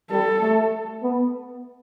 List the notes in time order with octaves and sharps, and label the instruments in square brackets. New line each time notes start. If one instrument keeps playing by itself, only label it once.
[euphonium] G3 [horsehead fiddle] A4
[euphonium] A3
B3